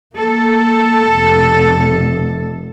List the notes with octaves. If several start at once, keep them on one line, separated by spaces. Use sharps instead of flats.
A#3 A4
F1